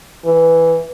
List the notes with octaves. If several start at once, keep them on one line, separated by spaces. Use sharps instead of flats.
E3